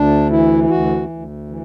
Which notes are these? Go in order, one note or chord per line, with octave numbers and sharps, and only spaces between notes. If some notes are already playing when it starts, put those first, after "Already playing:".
Already playing: D2 D4
E3 E4
E4
D2 F#4
D2
E3